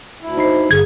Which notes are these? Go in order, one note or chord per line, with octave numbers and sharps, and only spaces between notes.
D2 E4
D#4 C5 B5 C7
G1 G2 D3 G#4 G#6